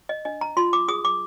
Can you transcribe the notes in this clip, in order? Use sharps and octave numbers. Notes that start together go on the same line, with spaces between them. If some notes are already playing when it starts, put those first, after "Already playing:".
D#5
D4 D#5
A#5
F4 C6
D6
G#4 D#6
D6